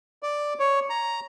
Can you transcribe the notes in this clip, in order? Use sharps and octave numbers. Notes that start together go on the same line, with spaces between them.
D5
C#5
A#5